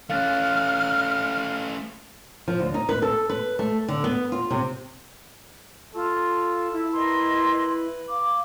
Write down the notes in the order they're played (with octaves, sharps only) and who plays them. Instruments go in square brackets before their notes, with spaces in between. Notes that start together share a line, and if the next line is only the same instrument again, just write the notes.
[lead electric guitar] A3 C#4 [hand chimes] F5 F#6 A6 [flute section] F6
[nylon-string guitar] F3
D2
D#4
B4
A4
B4
A3
D3
B3
F4
C3
[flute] F4 [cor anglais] A4
[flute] E4
[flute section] A#4 D#5 C6 [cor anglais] B4
[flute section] F5 [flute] D6